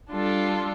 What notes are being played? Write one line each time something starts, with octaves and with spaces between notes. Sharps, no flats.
G3 D4 F4 A4